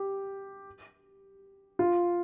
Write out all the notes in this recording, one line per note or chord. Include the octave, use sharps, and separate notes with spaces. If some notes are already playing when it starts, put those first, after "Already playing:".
Already playing: G4
F4